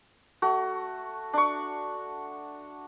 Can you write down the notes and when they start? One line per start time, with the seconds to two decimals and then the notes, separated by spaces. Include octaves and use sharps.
0.42 A3 F#4
1.33 D4 C#6